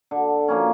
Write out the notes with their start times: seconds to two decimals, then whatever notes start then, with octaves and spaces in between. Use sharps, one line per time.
0.11 D3
0.48 F3 A#3 C#4